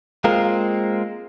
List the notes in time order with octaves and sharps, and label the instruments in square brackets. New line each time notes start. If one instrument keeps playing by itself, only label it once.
[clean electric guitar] G#3 A#3 C4 F4 A#4